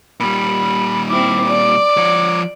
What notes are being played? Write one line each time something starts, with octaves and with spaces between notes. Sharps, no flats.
A#2 G3 B5
C4 E4 D6
D5
F3 C#5